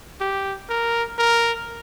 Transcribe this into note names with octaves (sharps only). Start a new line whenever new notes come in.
G4
A#4
A#4